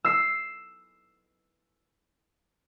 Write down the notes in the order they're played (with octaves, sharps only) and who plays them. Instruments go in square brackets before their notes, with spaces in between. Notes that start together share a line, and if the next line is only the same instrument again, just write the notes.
[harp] E6 C7